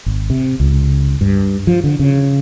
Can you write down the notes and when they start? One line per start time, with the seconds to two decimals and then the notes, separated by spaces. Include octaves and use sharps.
0.06 G#1
0.30 C3
0.60 C#2
1.21 G2
1.67 F3
1.84 D3
1.99 C#3